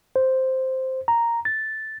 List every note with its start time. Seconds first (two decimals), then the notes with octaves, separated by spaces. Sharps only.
0.16 C5
1.08 A#5
1.45 A6